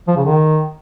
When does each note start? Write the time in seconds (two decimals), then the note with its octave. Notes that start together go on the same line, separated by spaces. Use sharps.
0.08 F3
0.17 C#3
0.25 D#3